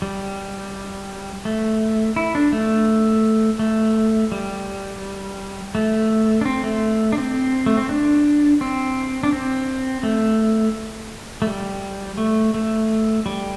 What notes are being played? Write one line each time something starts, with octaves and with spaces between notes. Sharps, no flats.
G3
A3
E4
D4
A3
A3
G3
A3
D4
C4
A3
D4
C4
A3
C4
D4
C4
D4
C4
A3
A3
G3
A3
A3
G3